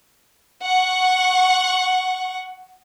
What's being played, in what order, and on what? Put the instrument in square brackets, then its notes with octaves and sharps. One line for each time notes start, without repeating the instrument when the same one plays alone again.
[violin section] F#5 C#6